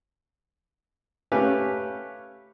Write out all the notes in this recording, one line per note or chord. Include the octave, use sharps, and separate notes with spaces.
A3 C#4 G4 B4 F5 G#5